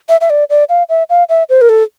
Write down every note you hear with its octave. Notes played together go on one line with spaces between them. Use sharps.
E5
E5
D5
D5
F5
E5
F5
E5
C5
A#4
A4